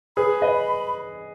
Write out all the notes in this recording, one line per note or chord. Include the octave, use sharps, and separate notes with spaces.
G#4 B4 B5
B4 D#5